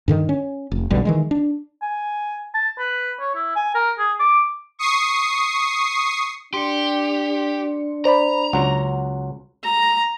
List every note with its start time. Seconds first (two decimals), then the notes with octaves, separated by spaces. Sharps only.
0.08 G2 D3 D#3
0.29 C#4
0.72 F1
0.90 B1 B2 D3 G3
1.05 D#3 E3 G#3
1.31 D4
1.82 G#5
2.55 A5
2.79 B4
3.20 C#5
3.36 E4
3.56 G#5
3.75 A#4
3.99 G#4
4.20 D6
4.79 C#6 D#6 C7
6.54 D4 G4 C6 C#7
8.05 C5 D5 A#5 B5
8.53 C#2 F#3 F#5
9.64 A#5